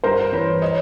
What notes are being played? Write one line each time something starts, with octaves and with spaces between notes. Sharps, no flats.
G2 A#4 C5
E3 B4 C#5
C#5 D#5